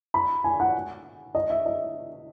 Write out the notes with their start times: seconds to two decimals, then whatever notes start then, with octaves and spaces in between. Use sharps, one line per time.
0.14 B5
0.44 G#5
0.60 F#5
1.35 D#5
1.50 E5
1.66 D#5